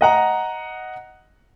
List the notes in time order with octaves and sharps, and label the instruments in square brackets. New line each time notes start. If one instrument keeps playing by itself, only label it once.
[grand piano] D#5 F#5 A#5